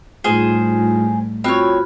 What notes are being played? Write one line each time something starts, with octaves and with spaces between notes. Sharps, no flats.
A2 G3 D#4 F4 G#4 C5
C4 F4 F#4 C#5 B5